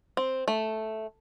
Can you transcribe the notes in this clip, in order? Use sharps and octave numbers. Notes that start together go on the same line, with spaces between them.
C4
A3